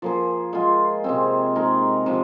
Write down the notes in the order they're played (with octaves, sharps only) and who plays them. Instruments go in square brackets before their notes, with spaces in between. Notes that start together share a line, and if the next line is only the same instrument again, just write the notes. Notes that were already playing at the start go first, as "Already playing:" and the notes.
[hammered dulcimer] F3 A#3 G#4
G#3 F4 G#4
C3 G#3 C4
G#3 D#4 A#4
C3 F3